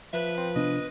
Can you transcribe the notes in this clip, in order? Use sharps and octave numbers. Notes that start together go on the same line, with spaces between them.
F3 B4 E5
C4
C3 B3 D4 D#5